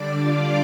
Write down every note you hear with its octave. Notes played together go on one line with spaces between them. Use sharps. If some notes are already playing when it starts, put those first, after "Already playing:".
Already playing: D3 G3 D4 D5 D6
F4 F5